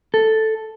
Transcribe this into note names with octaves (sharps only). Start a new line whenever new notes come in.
A4